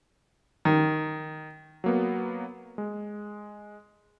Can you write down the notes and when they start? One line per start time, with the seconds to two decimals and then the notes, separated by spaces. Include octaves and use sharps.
0.65 D#3
1.84 F#3 A#3 B3
2.78 G#3